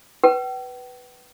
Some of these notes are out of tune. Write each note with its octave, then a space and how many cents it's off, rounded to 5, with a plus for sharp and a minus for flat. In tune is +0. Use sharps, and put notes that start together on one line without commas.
B4 +0 G5 -45